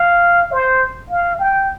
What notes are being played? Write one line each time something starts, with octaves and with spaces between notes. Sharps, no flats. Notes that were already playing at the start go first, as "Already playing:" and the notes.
Already playing: F5
C5
F5
G5